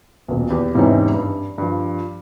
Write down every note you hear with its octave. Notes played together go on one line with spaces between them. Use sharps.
D#1 B1
E2 G4
E2 G#2 C3 E3 C#4 D#4
G2
G2 F3